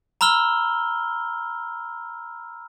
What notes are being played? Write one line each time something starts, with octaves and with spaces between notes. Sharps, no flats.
A#5 B5 E6 F6 G7